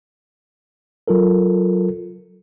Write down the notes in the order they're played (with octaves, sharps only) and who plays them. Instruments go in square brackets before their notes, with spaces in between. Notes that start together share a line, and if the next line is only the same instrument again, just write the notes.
[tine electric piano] F#3 F4 A4 A#4